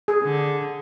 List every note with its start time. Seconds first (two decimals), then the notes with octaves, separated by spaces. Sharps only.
0.08 G#4
0.23 D3